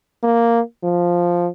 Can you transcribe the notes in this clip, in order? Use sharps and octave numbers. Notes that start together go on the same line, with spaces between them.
A#3
F3